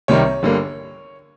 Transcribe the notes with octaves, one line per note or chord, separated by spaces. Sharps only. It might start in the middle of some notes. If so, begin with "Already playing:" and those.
C2 C3 D#3 G3 C4 C#5
G1 D3 G3 A#3